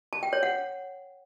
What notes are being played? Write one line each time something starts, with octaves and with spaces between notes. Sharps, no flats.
A5
G5
C#5
F#5